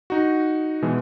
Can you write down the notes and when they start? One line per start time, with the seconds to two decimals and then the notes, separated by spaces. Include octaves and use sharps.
0.10 D#4 F#4
0.82 B2 E3 G#3